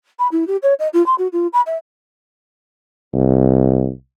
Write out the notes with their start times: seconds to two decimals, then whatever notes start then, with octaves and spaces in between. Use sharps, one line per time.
0.19 B5
0.32 E4
0.47 G4
0.62 C#5
0.79 D#5
0.93 F4
1.06 C6
1.18 F#4
1.32 F4
1.53 B5
1.66 E5
3.13 C2